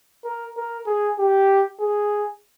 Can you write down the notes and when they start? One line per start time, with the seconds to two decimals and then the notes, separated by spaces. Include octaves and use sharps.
0.25 A#4
0.57 A#4
0.87 G#4
1.19 G4
1.80 G#4